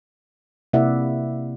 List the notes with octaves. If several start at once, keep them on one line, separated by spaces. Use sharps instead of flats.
C3 A#3 E4 D5 E5 F#5